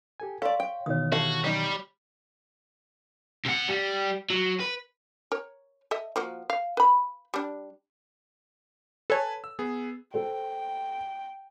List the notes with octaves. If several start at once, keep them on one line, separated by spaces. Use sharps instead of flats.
G4 A4 G#5
A4 C#5 D5 F5 C6
G5
B2 D#3 E3 C#5 D#6
E4 F#4 G4 A4 F5 A5 C#6
F#3 G3 D#4
C3 F#5
G3 G4
F#3
B4
A#4 C#5
A4 D#5 E5
F3 A#3 F#4
F5
B4 B5
G3 D4
A4 B4 C#5 G#5 A5
E6
B3 G#4
A4 C5 G5